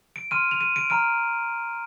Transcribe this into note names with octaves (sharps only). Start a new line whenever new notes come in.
D7
C6 F6 D#7
F7
D#7
D7
A#5 F6 D7